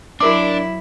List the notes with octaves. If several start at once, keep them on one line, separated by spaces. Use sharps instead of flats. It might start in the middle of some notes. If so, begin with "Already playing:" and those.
F#3 D4 E4 F#4 A#4 D6